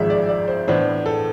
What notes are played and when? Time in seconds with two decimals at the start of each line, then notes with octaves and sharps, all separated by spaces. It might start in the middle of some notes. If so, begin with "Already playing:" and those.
Already playing: G#1 G#2 F3 G#3 E5
0.10 D5
0.29 D5
0.48 C5
0.68 A2 E3 B3 D4 C5
1.06 A4